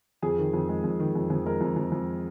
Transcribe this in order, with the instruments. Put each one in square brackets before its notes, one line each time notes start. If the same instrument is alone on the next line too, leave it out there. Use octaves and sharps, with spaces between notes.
[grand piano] F2 G#4
D#3
F2
G#3
F2
D#3
F2
F2
G#3 A#4
F2
F2
F2